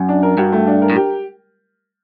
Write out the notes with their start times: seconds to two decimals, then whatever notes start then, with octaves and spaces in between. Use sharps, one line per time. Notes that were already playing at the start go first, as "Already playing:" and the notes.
Already playing: F#2
0.09 D4
0.23 A#4
0.38 G2 F#4
0.52 A3
0.67 D4
0.82 A#4
0.90 A2
0.96 G4